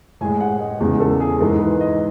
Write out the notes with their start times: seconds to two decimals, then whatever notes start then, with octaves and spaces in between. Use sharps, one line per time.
0.21 A2 G#5
0.24 G#3
0.40 F#5
0.60 D#5
0.80 E2 C#3 E3 G#3
1.00 A4
1.20 G#4
1.41 G#2 E3 G#3 A4
1.60 B4
1.81 D#5